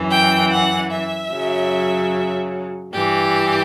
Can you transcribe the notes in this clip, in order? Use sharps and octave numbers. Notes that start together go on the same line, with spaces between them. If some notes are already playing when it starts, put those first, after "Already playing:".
Already playing: F#2 E3
G5
F#5
E5
F#2 C#3 F#3
G2 E3 G4